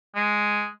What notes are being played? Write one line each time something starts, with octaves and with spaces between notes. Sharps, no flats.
G#3